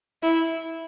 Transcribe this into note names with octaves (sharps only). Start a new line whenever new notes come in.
E4